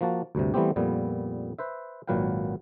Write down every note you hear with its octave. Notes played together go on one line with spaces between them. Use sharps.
F3 A#3 F#4 A5
D2 G2 C3
E3 G3 A3 B3 C4 G4
F2 A#2 G3 B3
B4 C5 E5
G#1 A#2 F#3 B4 F5 G5